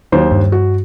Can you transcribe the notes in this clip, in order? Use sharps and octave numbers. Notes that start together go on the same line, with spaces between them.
D#2 F#3 C5
G2
F#4